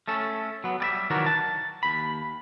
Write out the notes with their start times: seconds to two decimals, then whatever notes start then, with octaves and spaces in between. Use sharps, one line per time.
0.08 A3 C#4 A4
0.64 F#3 B3
0.80 G3 D5 E5
1.10 D#3 E3 F#3 D4 F#4 A#4
1.26 A5
1.83 D#2 B5